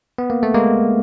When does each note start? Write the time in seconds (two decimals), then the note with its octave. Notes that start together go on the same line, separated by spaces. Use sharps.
0.18 B3
0.30 A#3
0.43 A3
0.54 G#3 A#3